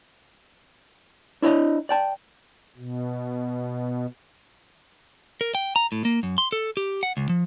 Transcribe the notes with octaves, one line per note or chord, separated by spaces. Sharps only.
D4 E4 C#5 D#5
D5 G5 A5
B2
A#4
G5
A#5
A2
A#3
F#2
C6
A4
G4
F#5
C#2
F3